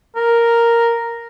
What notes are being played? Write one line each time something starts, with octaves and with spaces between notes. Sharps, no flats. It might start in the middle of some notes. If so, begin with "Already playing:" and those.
A#4